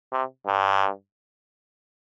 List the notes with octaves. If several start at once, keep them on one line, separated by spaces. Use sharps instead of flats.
C3
G2